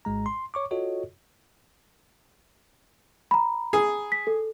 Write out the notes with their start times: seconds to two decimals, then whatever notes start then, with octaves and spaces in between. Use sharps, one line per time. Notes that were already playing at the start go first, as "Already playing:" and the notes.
0.05 G#1 G#2 G#3 A#5
0.26 C6
0.54 C#5 C#6 D6
0.71 F4 F#4 A4 C#5 D#5
3.31 A#5 B5
3.73 G#4
4.12 B6
4.27 A4